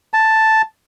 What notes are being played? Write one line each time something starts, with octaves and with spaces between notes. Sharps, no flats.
A5